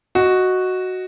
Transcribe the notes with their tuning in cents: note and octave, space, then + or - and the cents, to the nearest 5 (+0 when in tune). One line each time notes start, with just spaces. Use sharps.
F#4 +0 D#5 +0